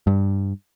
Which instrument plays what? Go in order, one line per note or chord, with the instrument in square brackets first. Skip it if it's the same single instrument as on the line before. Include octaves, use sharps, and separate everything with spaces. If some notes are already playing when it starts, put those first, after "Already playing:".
[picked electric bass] G2